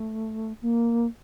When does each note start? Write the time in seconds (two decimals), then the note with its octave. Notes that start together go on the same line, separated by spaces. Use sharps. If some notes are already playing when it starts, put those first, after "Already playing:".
Already playing: A3
0.62 A#3